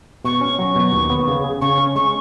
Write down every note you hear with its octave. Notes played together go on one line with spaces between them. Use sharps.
B2 C#6
C#4
F#3
B2
D#2
B3
C#3
G#4
C#3 C#6
C#4
G#3 C#6